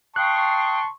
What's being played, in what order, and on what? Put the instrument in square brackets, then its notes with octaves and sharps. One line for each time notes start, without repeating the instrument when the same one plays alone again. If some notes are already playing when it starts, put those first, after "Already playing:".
[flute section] F5 G5 D#6 [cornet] A5 [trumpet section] C6 C#6 [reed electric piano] F#6